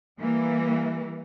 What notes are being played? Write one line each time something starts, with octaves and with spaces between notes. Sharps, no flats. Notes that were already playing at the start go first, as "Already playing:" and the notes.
E3 G3 A#3